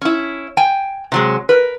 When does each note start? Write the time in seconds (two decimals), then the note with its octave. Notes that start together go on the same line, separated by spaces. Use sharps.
0.01 C#4 E4
0.57 G5 G#5
1.12 C3 F#3 G#3
1.49 A#4 B4